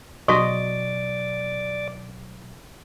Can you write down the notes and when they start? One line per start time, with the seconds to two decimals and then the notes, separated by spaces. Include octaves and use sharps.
0.28 B2 F#3 F#4 D5 D#5 C#6 D6